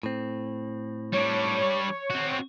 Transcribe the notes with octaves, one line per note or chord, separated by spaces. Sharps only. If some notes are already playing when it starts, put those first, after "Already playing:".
A2 C4
G3 D4 C#5
C4 F#4